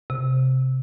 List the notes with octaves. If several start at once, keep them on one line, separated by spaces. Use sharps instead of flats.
C3